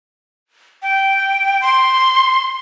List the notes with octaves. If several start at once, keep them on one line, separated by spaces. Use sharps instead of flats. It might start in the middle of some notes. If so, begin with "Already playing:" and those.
G5
C6